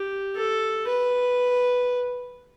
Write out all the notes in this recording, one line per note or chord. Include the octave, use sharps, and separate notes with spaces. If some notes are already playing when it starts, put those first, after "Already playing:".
Already playing: G4
A4
B4